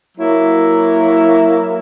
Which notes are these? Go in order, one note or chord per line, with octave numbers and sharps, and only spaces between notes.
F#3 A#3 E4